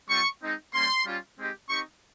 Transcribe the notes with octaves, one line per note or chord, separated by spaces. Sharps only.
G3 C4 F4 C#6
G#3 C4 D#4
G3 A#3 C#4 C6
G3 C#4 F4
G#3 C4 D#4 G4
C4 D#4 G4 C#6